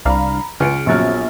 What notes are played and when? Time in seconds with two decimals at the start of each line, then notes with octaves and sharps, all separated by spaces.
0.05 C2 D4 F5 A#5 B5
0.60 C#2 C#3 F6 C#7 D7
0.86 A#1 F3 F#3 B3 C#6 F6 A6